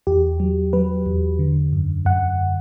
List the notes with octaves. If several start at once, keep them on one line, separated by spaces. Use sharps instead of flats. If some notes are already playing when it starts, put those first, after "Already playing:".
E2 G4
F#3
F#3 B4
E2
D3
F#2
F#2 F#5